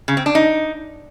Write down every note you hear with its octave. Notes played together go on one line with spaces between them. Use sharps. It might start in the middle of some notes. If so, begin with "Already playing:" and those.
C#3
C4
D4
D#4